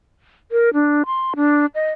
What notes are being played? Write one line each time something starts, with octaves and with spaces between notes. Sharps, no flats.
A#4
D4
C6
D4
D#5